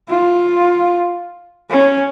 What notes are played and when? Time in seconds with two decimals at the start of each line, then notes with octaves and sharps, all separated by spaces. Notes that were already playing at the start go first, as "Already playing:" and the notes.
0.09 F4
1.70 C#4